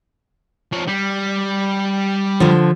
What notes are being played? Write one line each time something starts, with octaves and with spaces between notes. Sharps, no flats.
F3 C#5
G3
D3 F3